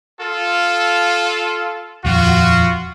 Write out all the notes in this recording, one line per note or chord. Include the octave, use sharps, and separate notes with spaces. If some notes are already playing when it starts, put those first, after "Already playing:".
F4 A4
D#1 F2 F4 F#4